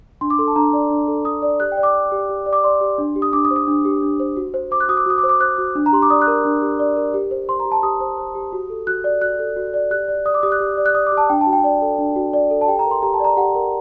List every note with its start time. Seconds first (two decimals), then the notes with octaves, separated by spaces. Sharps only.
0.21 D4 C6
0.30 D6
0.39 A4 C6
0.48 A5
0.56 D4 A#5
0.73 D5
0.90 D4
1.08 A4
1.25 D4 D#6
1.42 D5
1.60 G4 F#6
1.72 G5
1.77 D5
1.83 D6
1.94 D5
2.12 G4
2.29 G4
2.46 D5
2.53 D6
2.64 D5 C6
2.81 G4
2.98 D4
3.16 G4
3.22 D#6
3.33 D4 D6
3.45 D#6
3.51 C5
3.56 D#6
3.68 D4
3.85 G4
4.02 D4
4.20 C5
4.37 F#4
4.54 C5
4.71 C5 D6
4.80 F#6
4.89 F#4 D#6
4.97 D6
5.06 F#4 D#6
5.18 D6
5.23 C5
5.29 D6
5.40 C5 F#6
5.58 F#4
5.75 D4
5.86 A#5
5.92 G4 C6
6.02 D6
6.10 D5 D#6
6.22 F#6
6.27 A#4
6.45 D4
6.62 G4
6.79 D5
6.97 A#4
7.14 G4
7.31 C5
7.49 C5 C6
7.60 A#5
7.65 G4
7.72 A5
7.83 G4 D#6
8.00 C5
8.18 C5
8.35 G4
8.53 F#4
8.70 A4
8.87 F#4 F#6
9.04 D5
9.22 F#4 F#6
9.39 A4
9.56 F#4
9.74 D5
9.91 G4 F#6
10.08 D5
10.25 D5 D#6
10.34 D6
10.43 G4 D#6
10.52 F#6
10.60 G4
10.77 D5
10.86 F#6
10.95 D5 D#6
11.07 D6
11.12 G4
11.17 A5
11.29 D4 G5
11.41 A5
11.47 F#4
11.53 G5
11.64 D5
11.82 A4
11.99 D4
12.16 F#4
12.33 D5
12.51 A4
12.61 A5
12.68 G4 G5
12.79 A#5
12.86 A#4
12.91 C6
13.03 G4 A#5
13.14 A5
13.20 D5 A#5
13.37 G4 F#5
13.55 A#4